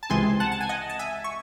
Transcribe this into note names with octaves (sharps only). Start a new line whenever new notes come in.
A5
C#2 C3 E3 G#3 C4 G#5 C6
F#5 A5
A5
G#5
D#5 F#5
A5
E5 G#5
C#6